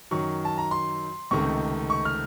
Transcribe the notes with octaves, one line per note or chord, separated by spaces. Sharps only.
F#2 D#3 F#3 C#6
A5
A#5
C6
C#2 C3 D#3 A3 C4 C#6
C#6
F6